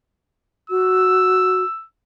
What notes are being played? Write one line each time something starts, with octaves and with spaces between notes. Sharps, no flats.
F#4 E6